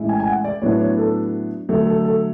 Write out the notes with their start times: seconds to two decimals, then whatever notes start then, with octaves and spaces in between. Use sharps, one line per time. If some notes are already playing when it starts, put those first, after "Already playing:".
Already playing: A2 E3 G#3 C#4 E4
0.09 G#5
0.20 G#5
0.27 F#5
0.44 D5
0.62 A2 F#3 B3 D4 C#5
0.80 C#5
0.98 A4
1.69 D3 F#3 A3 A4
1.87 A4
2.05 A4